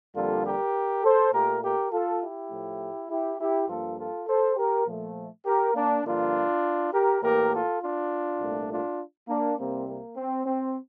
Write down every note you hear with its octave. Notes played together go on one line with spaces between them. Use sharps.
F2 D3 G3 A#3 F4 A4
G4 A#4
A4 C5
A#2 A3 G4 A#4
G4 A#4
F4 A4
E4 G4
A2 F3 A3
E4 G4
E4 G4
G2 F3 A#3 F4 A4
F4 A4
A4 C5
G4 A#4
A#2 F3 A3
G4 A#4
A#3 D4
G2 D3 F3 A#3 D4 F4
G4 A#4
A2 E3 A#3 G4 A#4
F4 A4
D4 F4
C2 A#2 A3
D4 F4
A#3 D4
C2 C3 G3 A#3 C4
A#3
C4
C4